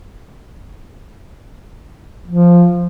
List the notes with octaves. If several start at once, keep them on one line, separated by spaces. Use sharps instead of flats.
F3